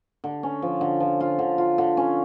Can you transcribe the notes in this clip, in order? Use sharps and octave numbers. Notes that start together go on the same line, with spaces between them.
D3
C#4
F3
D3
F3
F4
D3
F4
D3
C#4